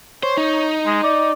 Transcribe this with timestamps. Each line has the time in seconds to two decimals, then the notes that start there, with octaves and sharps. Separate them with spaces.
0.23 C5 C#5
0.37 D#4
0.86 G#3
1.04 D5